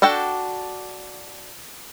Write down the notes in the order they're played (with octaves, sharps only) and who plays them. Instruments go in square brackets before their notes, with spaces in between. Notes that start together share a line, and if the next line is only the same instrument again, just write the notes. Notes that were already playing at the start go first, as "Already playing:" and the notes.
[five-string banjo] D4 F#4 A4 G5